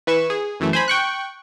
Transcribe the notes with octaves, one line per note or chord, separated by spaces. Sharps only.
E3 B4 C#6 E7
G#4
F#2 E3 A3
C5 G#5 B5
G5 C#6 F#6